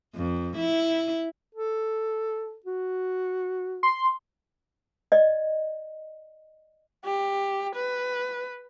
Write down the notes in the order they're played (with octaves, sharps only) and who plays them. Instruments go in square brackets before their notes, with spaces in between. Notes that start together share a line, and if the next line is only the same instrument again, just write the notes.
[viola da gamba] F2
E4
[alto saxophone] A4
F#4
[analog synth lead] C6
[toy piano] D5 D#5
[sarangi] G4
B4